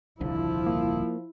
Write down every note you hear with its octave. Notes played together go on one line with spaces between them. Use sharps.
D#1 C2 D3 F3 E4
A#3